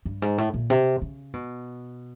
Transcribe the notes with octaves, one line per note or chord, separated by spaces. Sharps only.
G2
G#2
A2
A#2
C3
C#3
B2